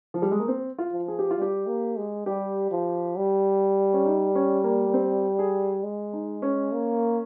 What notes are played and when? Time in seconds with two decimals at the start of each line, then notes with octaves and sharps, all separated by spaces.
0.14 F3
0.22 G3
0.31 G#3
0.40 A#3
0.48 C4
0.78 F4
0.92 F3
1.08 G#4
1.19 G4
1.31 F4
1.38 G3 G4
1.67 A#3
1.97 G#3
2.26 G3 G4
2.71 F3
3.16 G3
3.93 C#4
4.05 D#4
4.35 C#4
4.64 A#3
4.87 A#3
4.94 C4
5.39 G#4
5.83 G#3
6.13 D#4
6.42 C#4
6.72 A#3